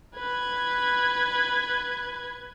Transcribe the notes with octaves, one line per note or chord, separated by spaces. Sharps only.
B4 G#6